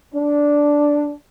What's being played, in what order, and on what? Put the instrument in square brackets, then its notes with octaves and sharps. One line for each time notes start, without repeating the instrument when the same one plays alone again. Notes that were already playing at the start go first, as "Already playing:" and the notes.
[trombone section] D4